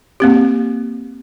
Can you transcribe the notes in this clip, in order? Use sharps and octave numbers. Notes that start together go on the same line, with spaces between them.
A#3 C4 G4